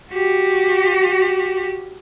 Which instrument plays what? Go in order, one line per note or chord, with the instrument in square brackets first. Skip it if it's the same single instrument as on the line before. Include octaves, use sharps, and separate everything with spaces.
[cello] F#4 G4